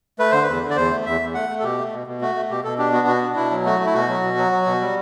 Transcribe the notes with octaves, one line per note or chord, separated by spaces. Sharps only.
A3 B4
D3 C5
B4
E2
D3
D5
E2 C5
A3
E2 E5
E2
A3 F#5
A3
A4
B2 G4
A3
B2
B2
A3 F#4
A3
B2 G4
B2 A4
D4 G4
B3 F#4
B2 F#4
D4
B2 E4
F#3
A3 F#4
A3
E4
B2 F#4
F#3
B2
F#3
F#3
B2
G3